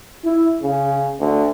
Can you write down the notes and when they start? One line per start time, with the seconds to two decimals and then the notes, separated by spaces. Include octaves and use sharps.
0.24 E4
0.63 C#3
1.20 D2